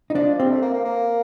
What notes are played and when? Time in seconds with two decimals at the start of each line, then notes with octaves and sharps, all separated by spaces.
0.10 D#4
0.15 F3 D4
0.39 G3 C4
0.50 A3
0.63 A#3
0.74 A#3
0.85 A#3